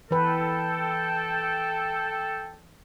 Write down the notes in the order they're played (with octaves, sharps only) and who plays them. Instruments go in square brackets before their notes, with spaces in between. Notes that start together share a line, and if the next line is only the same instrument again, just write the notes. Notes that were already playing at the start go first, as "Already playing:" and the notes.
[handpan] E3 B4 [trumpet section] A4 G5